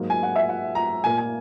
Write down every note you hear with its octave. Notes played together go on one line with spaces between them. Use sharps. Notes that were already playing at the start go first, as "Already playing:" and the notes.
Already playing: G#2 F#3 A#3
G#5
F#5
E5
F#5
A#5
A#2 A#3 G#5
G#5